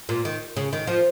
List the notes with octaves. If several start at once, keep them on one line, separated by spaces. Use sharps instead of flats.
A#2
D#3
C#3
D#3
F3